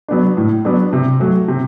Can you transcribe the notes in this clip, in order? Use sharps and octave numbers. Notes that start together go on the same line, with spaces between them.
F#3 B3 D4
A2
F#3 B3 D4
C3
F#3 A3
C3